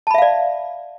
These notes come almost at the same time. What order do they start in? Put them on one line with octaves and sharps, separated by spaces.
A5 B5 E5 F5 D5